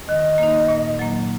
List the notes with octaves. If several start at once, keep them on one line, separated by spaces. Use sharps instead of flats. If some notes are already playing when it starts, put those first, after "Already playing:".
D#3 D#5
A#3 D#4
A#2
F#3 A#3